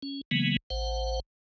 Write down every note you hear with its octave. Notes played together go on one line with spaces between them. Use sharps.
C#4
C#3 E3 F#3 G#3 A#3 B3
A1 C5 F#5